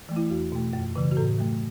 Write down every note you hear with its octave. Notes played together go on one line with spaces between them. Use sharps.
E3 A3
E4
E2 F#4
B2 A3
F#2
C#3 E3
F#4
A2 A4
F#3 A3